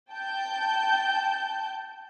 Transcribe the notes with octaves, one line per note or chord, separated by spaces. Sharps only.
G5 A5 G6